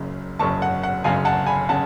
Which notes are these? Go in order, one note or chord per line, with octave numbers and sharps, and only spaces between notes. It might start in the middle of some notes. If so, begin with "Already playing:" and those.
Already playing: F#1 F#2 C#3
F#1 F#2 C#3 A5 C#6
F#5
F#5
F#1 F#2 C#3 F5 G#5
F#5 A5
G#5 B5
C#3 F#5 A5